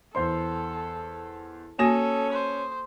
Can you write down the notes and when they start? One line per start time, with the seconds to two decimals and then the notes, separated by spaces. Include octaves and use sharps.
0.15 E2 A4 C5 C6
1.79 A#3 C#4 F#4 A4 G#5 D#6 A#6 E7
2.33 C5